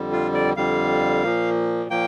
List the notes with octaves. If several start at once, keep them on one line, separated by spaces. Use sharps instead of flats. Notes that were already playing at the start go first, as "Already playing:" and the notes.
Already playing: F2 D3 G3
F4
D5
F2 D3 G3 F5
A#2 F3 A#3
A#2 F3 A#3 G5